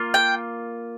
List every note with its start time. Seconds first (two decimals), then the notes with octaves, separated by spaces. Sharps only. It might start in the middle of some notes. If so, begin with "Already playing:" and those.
Already playing: A#3 F4
0.14 G5